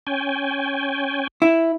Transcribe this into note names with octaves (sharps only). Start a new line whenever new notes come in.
C#4 G5 G#5
E4